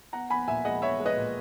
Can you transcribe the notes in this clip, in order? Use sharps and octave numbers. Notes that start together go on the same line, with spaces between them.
B3 F#5 A#5
B3 G#5 B5
A#2 E5 G#5
G#3 D#5 F#5
B3 C#5 E5
G#3
B4 D#5
A#2